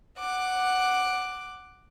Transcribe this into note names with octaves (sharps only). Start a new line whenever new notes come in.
F#5 D6